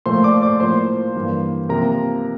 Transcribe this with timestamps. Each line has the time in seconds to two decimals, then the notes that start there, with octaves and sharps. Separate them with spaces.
0.06 A#2 F3 A3 C5 C6
0.24 D5 D6
0.42 D5 D6
0.60 A2 F3 A#3 C5 C6
1.15 G2 E3 G3 A#3
1.69 C3 F3 A#3 A#4 A#5